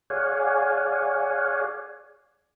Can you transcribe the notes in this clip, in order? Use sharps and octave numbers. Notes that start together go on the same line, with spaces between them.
G#4 C#5 D5 F5 F#5 G#5